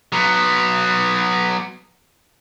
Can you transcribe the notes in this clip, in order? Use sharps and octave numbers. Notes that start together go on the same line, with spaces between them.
F#3 B3